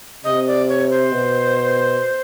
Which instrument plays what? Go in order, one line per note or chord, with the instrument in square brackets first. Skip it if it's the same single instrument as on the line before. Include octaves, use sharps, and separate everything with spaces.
[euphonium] C3 [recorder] D#5
[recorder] D5
C#5
C5
[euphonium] B2